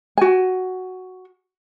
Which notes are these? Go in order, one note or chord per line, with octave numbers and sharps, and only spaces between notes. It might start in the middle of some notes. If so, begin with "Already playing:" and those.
F#4 G#5